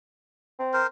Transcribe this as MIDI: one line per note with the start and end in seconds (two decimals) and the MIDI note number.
0.59 0.82 60
0.73 0.87 70
0.73 0.87 72